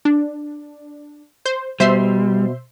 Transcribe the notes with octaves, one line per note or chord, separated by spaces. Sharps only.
D4
C5
B2 G3 C5 E5 C6